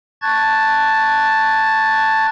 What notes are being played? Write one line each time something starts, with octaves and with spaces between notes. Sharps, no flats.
A5 C#6 F#6 G#6 A6